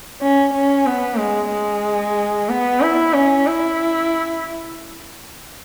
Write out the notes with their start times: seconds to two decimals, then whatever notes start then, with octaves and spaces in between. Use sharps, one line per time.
0.22 C#4
0.54 C#4
0.86 B3
1.19 G#3
1.51 G#3
2.49 B3
2.81 E4
3.14 C#4
3.47 E4